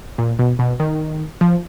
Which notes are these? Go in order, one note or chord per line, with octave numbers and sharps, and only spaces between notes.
A#2
B2
B2
D#3
F3